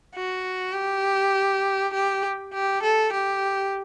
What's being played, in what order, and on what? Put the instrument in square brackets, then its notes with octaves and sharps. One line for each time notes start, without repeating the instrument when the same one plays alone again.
[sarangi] F#4
G4
G4
G4
A4
G4